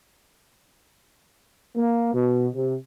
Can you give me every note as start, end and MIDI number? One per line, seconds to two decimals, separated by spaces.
1.76 2.11 58
2.14 2.47 47
2.55 2.75 48